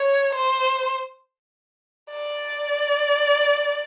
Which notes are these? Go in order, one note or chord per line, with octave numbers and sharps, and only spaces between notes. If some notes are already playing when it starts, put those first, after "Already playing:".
Already playing: C#5
C5
D5